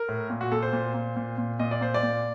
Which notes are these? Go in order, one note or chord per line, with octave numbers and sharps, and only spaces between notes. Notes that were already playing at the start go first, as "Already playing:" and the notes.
Already playing: A#4
A2
A#2
F#4
A#2 A4
C5
A#2
A#2
A#2
A#2
A#2 D#5
D5
A#2 C5
D5
A#2